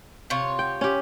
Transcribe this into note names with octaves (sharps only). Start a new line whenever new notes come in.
C3 F4 C#5
G5
C#4 G4